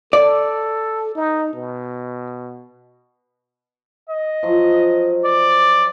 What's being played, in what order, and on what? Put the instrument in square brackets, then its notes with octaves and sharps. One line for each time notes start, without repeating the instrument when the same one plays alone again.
[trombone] A4 [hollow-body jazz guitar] D5
[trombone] D#4
B2
[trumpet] D#5
[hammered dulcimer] F3 F#3
[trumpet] D5